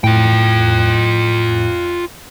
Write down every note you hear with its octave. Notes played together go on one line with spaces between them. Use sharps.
A2 F4 G5